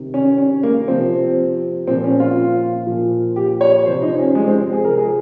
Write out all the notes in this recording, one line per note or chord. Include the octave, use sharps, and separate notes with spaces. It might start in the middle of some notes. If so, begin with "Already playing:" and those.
Already playing: C3 D#3
C#4
C#4
A#3
C3 F3 C4
A#2 F3 C4
C#4
F4
A#2 F3
G4
C#5
C3 F3 C5
D#4
C#4
G#3
C4
G#4
C3 F3 A#4
G#4